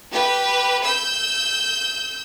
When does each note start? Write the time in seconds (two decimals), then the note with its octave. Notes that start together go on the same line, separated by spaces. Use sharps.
0.11 G4 B4
0.84 E6 G6